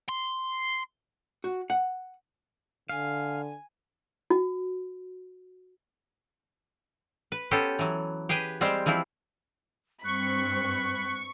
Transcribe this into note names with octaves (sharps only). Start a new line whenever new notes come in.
C6
F#4
F#5
D3 F5 G#5
F#4
B4
B3 C#4 G4 A4 C5
E3 F#3
G4 G#4 B4 G5
G3 G#3 C4 G4 C5
E3 F3 C4 E4
G2 C4 B5 C#6 F#6